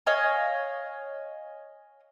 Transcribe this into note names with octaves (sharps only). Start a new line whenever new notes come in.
C#5 D#5 F5 G#5